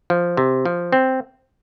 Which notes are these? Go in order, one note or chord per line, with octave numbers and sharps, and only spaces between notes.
F3
C3
F3
C4